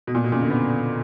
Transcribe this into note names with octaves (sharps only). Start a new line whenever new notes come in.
B2
A#2
B2
A#2 C#3
B2 D3
B3